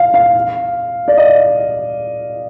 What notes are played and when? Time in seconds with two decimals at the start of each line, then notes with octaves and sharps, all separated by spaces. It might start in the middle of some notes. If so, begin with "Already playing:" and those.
Already playing: F5
0.14 F5
1.08 D5
1.17 D#5